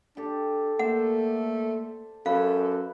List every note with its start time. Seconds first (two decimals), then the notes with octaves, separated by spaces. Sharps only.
0.17 D4 G4 A4
0.79 A3 A#3 C5 D5 E5 F#5
2.26 F#2 A4 B4 C#5 F5 B5